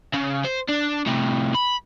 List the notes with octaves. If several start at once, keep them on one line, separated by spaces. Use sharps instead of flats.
C#3
C5
D4
A2 C3
B5